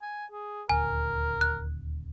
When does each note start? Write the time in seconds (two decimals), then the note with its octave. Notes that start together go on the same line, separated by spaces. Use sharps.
0.02 G#5
0.31 G#4
0.69 D#1 D2 A#4 G#5
1.41 F#6